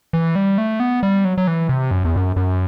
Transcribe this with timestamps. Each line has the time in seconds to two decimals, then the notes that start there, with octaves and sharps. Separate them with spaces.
0.13 E3
0.35 G3
0.58 A3
0.80 B3
1.03 G3
1.25 F#3
1.38 F#3
1.47 E3
1.69 C3
1.91 F#2
2.04 E2
2.16 F#2
2.36 F#2